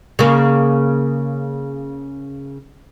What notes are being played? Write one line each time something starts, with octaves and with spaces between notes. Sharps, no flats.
C#3 A#3